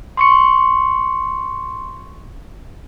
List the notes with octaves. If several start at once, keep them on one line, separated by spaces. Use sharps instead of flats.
C6 C#6 C#7